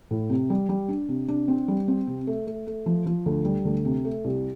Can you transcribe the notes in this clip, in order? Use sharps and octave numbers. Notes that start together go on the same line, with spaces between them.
A2
C3
G3
G3
D4
C3
D4
C4
G3
C4
C3
A3
A3
A3
F3
F3
D2
G3
D2
C3
A3
C2